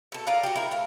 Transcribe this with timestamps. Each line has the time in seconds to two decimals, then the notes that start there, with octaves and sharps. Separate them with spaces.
0.12 B2 A4
0.27 F4 A#4 D5 F5
0.43 F#4 G4
0.56 E4 A#4
0.71 A3 F5